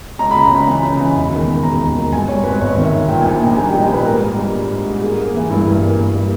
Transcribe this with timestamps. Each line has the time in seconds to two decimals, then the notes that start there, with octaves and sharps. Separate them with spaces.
0.19 C#2 A#5
0.31 C#3 B5
0.43 A#5
0.51 C#2 B5
0.67 E3
0.83 C#3
0.99 E3
1.16 E1
1.32 D#3
1.48 D#3
1.63 E1 A#5
1.80 D#2
1.96 D#3
2.12 G2 G#5
2.28 G2 C#5
2.44 G#1 B4
2.61 G#1 C#5
2.77 D#3
2.84 E5
2.93 D#3
3.09 A#2 G5
3.21 G#5
3.25 A#1
3.33 G#5
3.41 A#1 A#5
3.57 G3 G#5
3.69 G3 G5
3.81 D#5
3.90 A#2 B4
4.05 G#2 A#4
4.21 G#2
4.37 G3
4.53 G#2
4.70 G#2
4.85 G#2
5.01 A#3 G#4
5.17 A#3
5.34 E3
5.50 G2 E4
5.65 G2
5.82 A#3
5.98 G2
6.14 G3